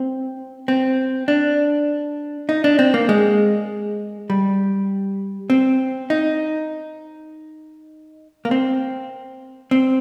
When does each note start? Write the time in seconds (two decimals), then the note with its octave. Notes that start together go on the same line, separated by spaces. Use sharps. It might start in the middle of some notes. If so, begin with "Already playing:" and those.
Already playing: C4
0.68 C4
1.28 D4
2.49 D#4
2.64 D4
2.79 C4
2.94 A#3
3.09 G#3
4.30 G3
5.50 C4
6.10 D#4
8.45 A#3
8.51 C4
9.71 C4